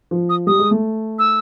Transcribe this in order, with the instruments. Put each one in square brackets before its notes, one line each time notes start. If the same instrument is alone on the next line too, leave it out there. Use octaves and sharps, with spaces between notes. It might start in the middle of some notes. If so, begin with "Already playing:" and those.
[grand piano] F3
[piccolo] D#6
[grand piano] G3 [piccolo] D#6
[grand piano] G#3
A3
[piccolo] E6